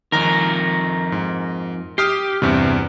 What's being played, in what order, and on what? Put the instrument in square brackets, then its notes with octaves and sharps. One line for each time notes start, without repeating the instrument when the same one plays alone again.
[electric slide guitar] F2 A#4 [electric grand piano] D#3 A#5
[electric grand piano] G#2
[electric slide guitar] G4 [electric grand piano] D#6 F6 C7
[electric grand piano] E2 G2 [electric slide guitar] C3 C4